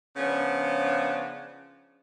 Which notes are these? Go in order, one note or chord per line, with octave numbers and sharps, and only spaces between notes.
C#3 F3 B3 C#4 D4